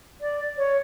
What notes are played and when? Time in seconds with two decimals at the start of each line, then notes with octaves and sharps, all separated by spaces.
0.21 D5
0.58 C#5